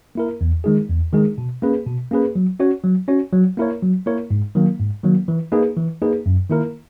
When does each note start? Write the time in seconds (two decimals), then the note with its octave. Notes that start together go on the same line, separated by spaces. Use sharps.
0.15 A#3 E4 A#4
0.41 E2
0.64 D#3 G#3 D#4 G#4
0.90 E2
1.13 D#3 G#3 D#4 G#4
1.38 B2
1.62 A#3 C#4 G#4 B4
1.87 B2
2.11 A#3 C#4 G#4 B4
2.35 F#3
2.60 C#4 F#4 C#5
2.84 F#3
3.08 C#4 F#4 C#5
3.33 F#3
3.57 A#3 E4 A#4 C#5
3.82 F#3
4.06 A#3 E4 A#4 C#5
4.31 G#2
4.55 D#3 F#3 A#3
4.79 G#2
5.04 D#3 F#3 A#3
5.28 E3
5.52 A#3 D#4 G#4 B4
5.77 E3
6.02 A#3 D#4 G#4 B4
6.26 F#2
6.50 D#3 A#3 E4 A#4